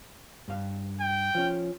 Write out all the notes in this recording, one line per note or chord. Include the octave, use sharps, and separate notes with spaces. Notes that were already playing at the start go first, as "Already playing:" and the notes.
G2 F5
G5
F3 C#4